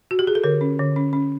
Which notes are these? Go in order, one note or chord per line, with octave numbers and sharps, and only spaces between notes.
F#4
G4
G#4
A4
D3 A#4
C#4
D3
C#4
C#4